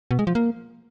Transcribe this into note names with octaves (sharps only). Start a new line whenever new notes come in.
B2
G#3
F3
A#3